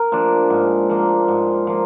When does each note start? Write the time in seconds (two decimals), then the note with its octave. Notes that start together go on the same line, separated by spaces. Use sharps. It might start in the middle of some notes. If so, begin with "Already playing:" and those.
Already playing: A#4
0.12 F3 A#3 D4
0.50 G#2
0.90 F3 A#3
1.28 G#2
1.67 F3 A#3